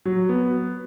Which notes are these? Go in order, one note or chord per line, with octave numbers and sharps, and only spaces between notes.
F#3
B3